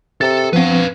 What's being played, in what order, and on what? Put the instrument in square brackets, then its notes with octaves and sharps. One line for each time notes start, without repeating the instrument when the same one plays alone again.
[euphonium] C3 [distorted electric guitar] A4 [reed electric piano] A6
[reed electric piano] F3 C4 [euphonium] B3 [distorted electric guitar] B4 F5